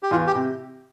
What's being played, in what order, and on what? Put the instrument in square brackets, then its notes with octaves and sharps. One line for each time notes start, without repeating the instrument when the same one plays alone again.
[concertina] G4
[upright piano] E2 [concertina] F4
[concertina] G4
[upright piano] C3